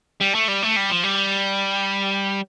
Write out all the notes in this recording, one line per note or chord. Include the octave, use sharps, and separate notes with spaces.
G3
A3
G3
A3
G3
F3
G3